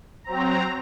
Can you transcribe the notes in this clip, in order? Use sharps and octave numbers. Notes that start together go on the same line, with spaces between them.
F#3 C4 A#5